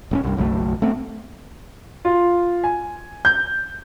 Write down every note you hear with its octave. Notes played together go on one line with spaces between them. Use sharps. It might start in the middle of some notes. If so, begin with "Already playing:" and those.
D#1 B3 C#4
C2 G2
F#1 B1 F#3 A3
A3 B3 C4
F4
G#5
G6